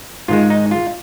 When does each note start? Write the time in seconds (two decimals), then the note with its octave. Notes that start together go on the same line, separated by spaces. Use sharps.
0.28 G#2 D#3 G#3 F4
0.50 D#4
0.71 F4